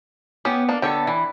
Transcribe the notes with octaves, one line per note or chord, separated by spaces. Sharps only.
B3 C#4 G4
A#3 D4
D3 B3 A4 C#5 G5
E3